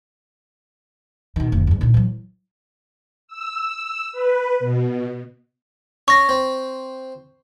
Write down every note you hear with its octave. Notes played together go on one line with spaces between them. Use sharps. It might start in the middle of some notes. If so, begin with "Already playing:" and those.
B2 D#3
F1 D2
E2 G2
A#2 D4
E3 F#3
E6
B4
B2
C#4 C#6 A#6
C4